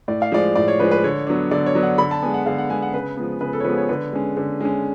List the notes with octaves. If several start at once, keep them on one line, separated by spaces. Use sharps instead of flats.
A2 D5
F5
F3 G#3 D5
A2 D5
C#5
F3 G#3 B4
B4
D3 C#5
F#3 B3 D4
D3 D5
C#5
F#3 B3 D4
F#5
D3 B5
A5
G#3 B3 G#5
F#5
D3 F5
F#5
G#3 B3 G#5
F#5
C#3 B4
F3 G#3 B3
C#3 B4
A4
C#5
F3 G#3 B3 B4
C#5
D3 B4
G#3 C#4
D3
G#3 C#4